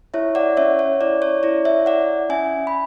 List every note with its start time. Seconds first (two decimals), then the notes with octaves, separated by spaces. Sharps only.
0.14 E4 C#5 E5
0.35 D5 F#5
0.57 C#4 C#5 E5
0.79 C#5
1.01 E4 D5
1.22 C#5
1.43 E4 D5
1.65 C#5 E5
1.86 E4 D5 F#5
2.29 C#4 E5 G#5
2.67 B5